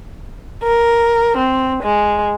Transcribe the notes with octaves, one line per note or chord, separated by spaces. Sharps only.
A#4
C4
G#3